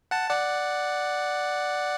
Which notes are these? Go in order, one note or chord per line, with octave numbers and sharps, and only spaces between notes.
F#5 A5
D5 F#5